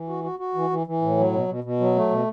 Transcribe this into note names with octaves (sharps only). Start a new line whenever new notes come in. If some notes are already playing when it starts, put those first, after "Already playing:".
Already playing: E3
F#4
F#4
F#4
E3
E3
E3
A2
F#3
B2
B2
B2
F#3
A3
B2